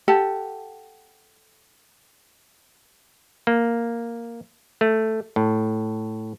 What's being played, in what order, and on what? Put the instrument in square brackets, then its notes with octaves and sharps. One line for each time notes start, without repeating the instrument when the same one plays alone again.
[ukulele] G4 A4 F#5 A5
[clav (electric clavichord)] A#3
A3
A2